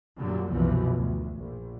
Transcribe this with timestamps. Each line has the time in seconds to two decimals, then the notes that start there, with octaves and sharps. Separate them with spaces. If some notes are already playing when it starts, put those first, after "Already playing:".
0.19 F#2 A#2 D3 F#3 G3
0.51 C2 F#2 B2 E3 F3
0.94 D2
1.36 A#1